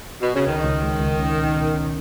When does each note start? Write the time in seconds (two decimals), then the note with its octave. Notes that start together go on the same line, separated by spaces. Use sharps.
0.21 B2
0.34 C#3
0.47 C#2 D#3
0.64 C#2
0.83 G#3
1.01 C#2
1.20 C#4
1.38 B2
1.56 B2
1.74 C#4